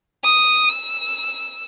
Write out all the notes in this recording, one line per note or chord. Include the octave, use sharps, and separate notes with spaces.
D#6
E6